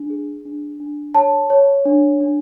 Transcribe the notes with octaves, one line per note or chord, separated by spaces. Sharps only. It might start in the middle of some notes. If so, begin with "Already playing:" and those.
Already playing: D4
G#4
D4
D4
C#5 A5
C#5
D4
D4